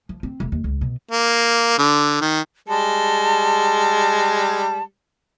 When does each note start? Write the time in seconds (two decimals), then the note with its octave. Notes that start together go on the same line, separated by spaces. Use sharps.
0.09 F3
0.23 C4
0.40 E1
0.52 D#2
0.64 C#2
0.81 B2
1.11 A#3
1.78 D3
2.21 D#3
2.68 G3 G#3 A5